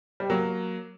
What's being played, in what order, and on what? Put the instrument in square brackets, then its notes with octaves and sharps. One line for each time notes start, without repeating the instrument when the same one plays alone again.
[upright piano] G3
F#3 A#3